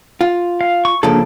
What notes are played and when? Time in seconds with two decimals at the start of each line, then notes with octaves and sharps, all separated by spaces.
0.21 F4
0.61 F5
0.85 C#6
1.03 C#2 F3 A#3 D4 G#4 A4